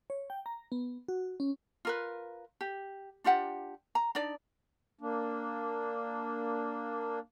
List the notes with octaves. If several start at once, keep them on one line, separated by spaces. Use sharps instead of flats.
C#5
G5
A#5
B3
F#4
C#4
F4 A#4 B4
G4
D4 F4 G4 F#5
A#5
D4 D#4 D5
A#3 D4